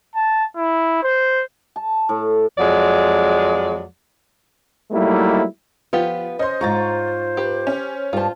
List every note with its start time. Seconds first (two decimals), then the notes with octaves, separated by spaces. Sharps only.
0.15 A5
0.56 E4
1.03 C5
1.76 A5
2.09 A2
2.58 F2 F#3 G#3 D5
4.91 F#3 G3 A3 A#3 D#4 E4
5.93 F3 B3 F4 G4 B4
6.39 C#4 C5 D#5 C6
6.61 G#2 F4 A#5 C#6 A6
7.37 G4 B4
7.67 C#4
8.13 G2 F4 C5 A5